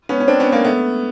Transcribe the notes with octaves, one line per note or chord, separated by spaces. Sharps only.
B3 C#4
C#4
C4 D4
B3 C#4
A#3 C4
A3 B3